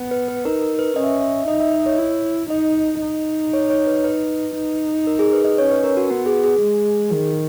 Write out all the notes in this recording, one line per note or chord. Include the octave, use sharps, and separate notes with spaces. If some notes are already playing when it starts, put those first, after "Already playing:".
Already playing: B3
B4
B4
D#4 A#4
A#4
B4
C#4 D#5
E5
D#5
E5
D#5
D#4 D#5
E5
D#5
C#5
E4
D#4 D#5
D#4
C#5
C#5
B4
B4
D#4
A#4
G#4
B4
D#5
C#4 C#5
B4
A#4
F#4
B3 F#4
G#4
G#4
G#3
D#3